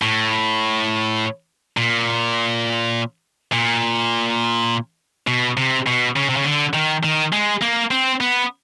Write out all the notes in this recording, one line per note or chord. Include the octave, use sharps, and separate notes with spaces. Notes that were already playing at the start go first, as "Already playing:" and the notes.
A2
A#2
A#2
B2
C3
B2
C#3
C3
C#3
D3
D#3
D#3
G#3
A#3
C4
B3